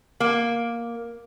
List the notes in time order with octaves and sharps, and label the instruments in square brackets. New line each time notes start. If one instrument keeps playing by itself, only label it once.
[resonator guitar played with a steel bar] A#3